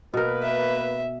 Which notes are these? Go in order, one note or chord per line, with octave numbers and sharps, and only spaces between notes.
B2 A#3 A#4 B4
E5